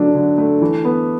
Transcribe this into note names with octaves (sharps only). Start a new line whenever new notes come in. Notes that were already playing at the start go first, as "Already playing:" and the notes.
Already playing: D3 F#3 A3 D4
D3
A3
E3
B3